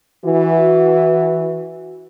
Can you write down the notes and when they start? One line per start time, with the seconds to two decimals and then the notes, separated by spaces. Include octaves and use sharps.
0.25 E3 F#4